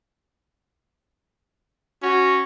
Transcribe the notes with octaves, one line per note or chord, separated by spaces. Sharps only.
C#4 F#4